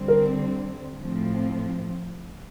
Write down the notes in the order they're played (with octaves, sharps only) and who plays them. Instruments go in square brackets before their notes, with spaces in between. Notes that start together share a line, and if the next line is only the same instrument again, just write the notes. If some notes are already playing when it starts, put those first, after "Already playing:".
Already playing: [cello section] D3 G3 C4
[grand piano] A#4
[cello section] A2 F3 C4